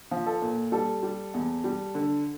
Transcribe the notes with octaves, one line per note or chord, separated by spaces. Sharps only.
F3
A4
A#2
G3 A4
G3
E2
G3
D3